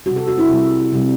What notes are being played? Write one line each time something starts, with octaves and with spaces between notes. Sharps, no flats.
C3 G3 F#4
A4
F#4
E4
C3 G3
C3 G3